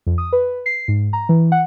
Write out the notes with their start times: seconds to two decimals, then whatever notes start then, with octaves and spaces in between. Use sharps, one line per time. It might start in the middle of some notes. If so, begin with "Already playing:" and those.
0.07 F2
0.18 D#6
0.33 B4
0.66 C7
0.88 G#2
1.13 A#5
1.29 E3
1.52 F#5